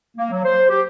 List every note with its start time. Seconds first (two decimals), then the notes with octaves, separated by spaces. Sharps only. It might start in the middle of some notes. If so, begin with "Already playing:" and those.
0.17 A#3
0.31 F#3
0.44 C5
0.69 G4